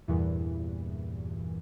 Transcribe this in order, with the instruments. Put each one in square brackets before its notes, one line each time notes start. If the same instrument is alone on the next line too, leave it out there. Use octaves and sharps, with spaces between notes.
[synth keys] E2 G2 A#2 E3